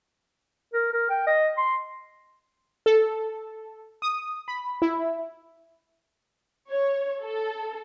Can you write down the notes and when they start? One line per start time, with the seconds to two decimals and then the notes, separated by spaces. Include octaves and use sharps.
0.74 A#4
0.92 A#4
1.09 G5
1.27 D#5
1.58 C6
2.86 A4
4.02 D#6
4.48 B5
4.82 E4
6.70 C#5
7.22 A4